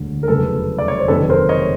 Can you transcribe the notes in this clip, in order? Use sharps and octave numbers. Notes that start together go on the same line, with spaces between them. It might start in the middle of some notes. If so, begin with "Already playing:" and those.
Already playing: E1 D2 D3
A#4
F1 E2 C#3 F#3 A4 B4
D5
C#5
C5
F#1 F2 C3 D#3 A4 B4
A#4 C5
C#5 D#5